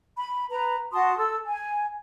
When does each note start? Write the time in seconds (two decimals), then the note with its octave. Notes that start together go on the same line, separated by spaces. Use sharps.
0.18 B5
0.51 B4 A#5
0.93 F#4 A5 C6 D#6
1.17 A4 E6
1.47 G#5